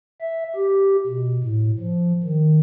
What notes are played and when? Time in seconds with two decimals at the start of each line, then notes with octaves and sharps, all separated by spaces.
0.21 E5
0.56 G4
1.07 B2
1.43 A2
1.79 F3
2.23 D#3